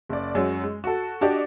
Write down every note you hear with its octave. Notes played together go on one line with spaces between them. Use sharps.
F#1 D5
F#2 F#3 G#3
G#3
F#4 A4
D4 F#4 G4 D5 D#5